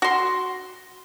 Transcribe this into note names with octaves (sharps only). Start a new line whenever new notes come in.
F#4 C6